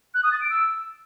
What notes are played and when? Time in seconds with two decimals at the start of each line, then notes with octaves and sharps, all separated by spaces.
0.14 F#6
0.23 D#6
0.31 A6
0.40 D7
0.49 E6